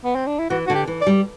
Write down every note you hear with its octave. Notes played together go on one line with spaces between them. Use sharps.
B3
C4
D4
E4
E3 F#4
D3 F#4
G4
E3
D5
G3